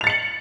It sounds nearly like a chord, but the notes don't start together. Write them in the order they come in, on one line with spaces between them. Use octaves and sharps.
F7 A6 C#7 F#7